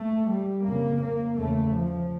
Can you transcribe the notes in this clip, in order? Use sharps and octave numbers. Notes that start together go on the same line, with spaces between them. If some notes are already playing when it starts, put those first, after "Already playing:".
Already playing: A3
G3
F2 C#3 A#3
A#3
E2 C#3 A3
F3